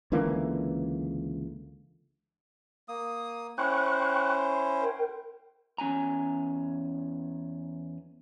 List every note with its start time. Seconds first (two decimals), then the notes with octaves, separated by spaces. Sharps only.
0.12 C#2 D3 E3 A#3
2.88 A#3 D#6
3.58 C#4 E4 C5 G5 C#6 F#6
4.34 C6
4.81 A#4 G5
5.78 E2 C#4 G#5 A#5